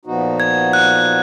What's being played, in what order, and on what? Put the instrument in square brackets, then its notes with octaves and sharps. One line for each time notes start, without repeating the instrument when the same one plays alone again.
[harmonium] A#2 F3 B3 D#4 F#4
[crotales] G#6
F#6